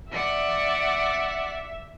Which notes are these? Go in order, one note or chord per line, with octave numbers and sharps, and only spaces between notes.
D5 E5 F#5